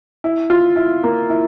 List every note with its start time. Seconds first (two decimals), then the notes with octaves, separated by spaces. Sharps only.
0.24 E4
0.50 F4
0.76 E4
1.03 A#3
1.30 E4